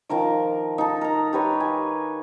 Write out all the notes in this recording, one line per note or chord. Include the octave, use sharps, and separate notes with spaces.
D#3 F3 A#4 D6
D#4 A4
A#4 A#5
G4 B4 C#5 F5
G#5